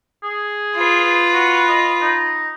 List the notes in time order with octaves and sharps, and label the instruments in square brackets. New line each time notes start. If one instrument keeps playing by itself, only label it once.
[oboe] G#4
[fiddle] F4 B4
[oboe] F#4
D#5
D#4